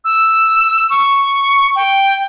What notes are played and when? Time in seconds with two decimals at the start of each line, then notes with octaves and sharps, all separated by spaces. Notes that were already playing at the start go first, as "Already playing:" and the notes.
0.05 E6
0.90 C#6
1.76 G5